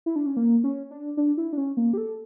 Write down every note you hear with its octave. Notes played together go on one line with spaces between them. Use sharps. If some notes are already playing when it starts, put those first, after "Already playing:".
E4
D4
C#4
A#3
C#4
D4
D4
E4
D4
C#4
A#3
G4
A4